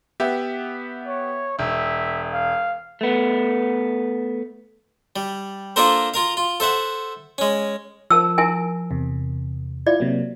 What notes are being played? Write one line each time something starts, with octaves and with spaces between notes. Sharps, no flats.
B3 G4 E5
C#5
E1 E5
F5
A3 B3
G3
A#3 D4 F4 A4 A#4 C5
F4 A#4 F5
F4
A4 C5 E5 F#5
G#3 C#4
F3 A#4 A5 E6
E4 A#4 G#5
E2 C3
E4 F4 D5
C3 F#3 A#3